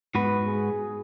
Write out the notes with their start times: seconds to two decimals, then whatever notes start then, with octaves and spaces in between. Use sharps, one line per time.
0.15 G#2 B3 F#4 B4
0.47 G#4